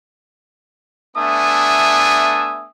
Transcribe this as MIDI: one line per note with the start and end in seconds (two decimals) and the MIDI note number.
1.17 2.67 57
1.17 2.67 59
1.17 2.67 62
1.17 2.67 76
1.17 2.67 80
1.17 2.67 87